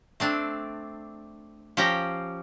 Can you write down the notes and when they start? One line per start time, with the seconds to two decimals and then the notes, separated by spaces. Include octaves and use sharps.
0.20 A3 C4 D4
1.77 F3 C#4 G4 G5 A#5